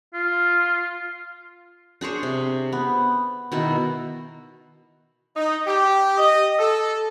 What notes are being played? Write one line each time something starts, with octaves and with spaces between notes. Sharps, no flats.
F4
D4 G#4 C5 C#5
C3
B3
B2 D#3 E4
D#4
G4
D#5
A4